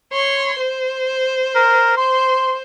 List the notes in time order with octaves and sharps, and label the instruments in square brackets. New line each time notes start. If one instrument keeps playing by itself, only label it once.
[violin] C#5 C6
C5
[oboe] A#4
[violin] C5 [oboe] C6